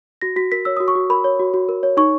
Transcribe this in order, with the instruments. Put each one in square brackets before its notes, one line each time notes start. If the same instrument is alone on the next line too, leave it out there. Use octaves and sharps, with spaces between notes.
[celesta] F#4 A#6
F#4 B6
A#4 B6
C#5 E6
F#4 D#6
C#6
F#4
A#4 B5
C#5
F#4
F#4
A#4
C#5
D#4 C#6